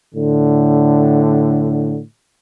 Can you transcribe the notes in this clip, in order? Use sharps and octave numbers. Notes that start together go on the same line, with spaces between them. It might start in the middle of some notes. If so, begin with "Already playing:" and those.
A2 D3